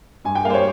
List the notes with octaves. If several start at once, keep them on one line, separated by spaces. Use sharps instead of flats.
G2 G#5
G5
G3 A#3 F5
C5
C#5